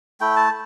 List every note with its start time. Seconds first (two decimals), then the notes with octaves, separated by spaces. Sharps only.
0.20 A3 E4 G5
0.36 A5